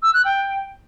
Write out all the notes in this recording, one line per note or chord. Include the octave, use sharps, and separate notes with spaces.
E6
F#6
G5